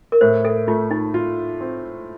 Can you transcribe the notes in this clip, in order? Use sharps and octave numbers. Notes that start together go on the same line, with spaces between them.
A#4
A2 C5
A4
A3 F4
D#4
F4
C4